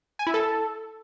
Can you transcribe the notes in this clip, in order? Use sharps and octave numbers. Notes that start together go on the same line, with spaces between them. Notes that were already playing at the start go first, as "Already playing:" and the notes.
G#5
E4
A4